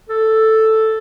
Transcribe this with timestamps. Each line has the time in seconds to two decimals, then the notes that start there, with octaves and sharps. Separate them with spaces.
0.09 A4